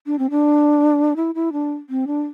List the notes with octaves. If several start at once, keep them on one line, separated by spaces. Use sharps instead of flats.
D4
C4
D4
E4
E4
D4
C4
D4